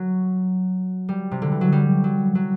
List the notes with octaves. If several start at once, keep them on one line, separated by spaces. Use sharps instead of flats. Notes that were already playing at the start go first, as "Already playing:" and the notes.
Already playing: F#3
G3
C3
D3
E3
F#3
G3
F#3
F#3